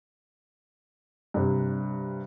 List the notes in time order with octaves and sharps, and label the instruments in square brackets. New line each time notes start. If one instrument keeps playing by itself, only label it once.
[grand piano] G2 C3